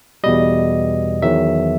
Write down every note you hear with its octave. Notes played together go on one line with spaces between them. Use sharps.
E2 B2 G3 D#5
E2 D#3 F#3 E5